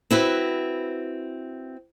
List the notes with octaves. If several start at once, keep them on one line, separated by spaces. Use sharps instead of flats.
C4 E4 F#4 B4